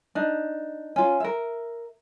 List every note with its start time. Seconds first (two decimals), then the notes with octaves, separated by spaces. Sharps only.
0.15 D4 D#4
0.96 C#4 F4
1.20 A#4 E5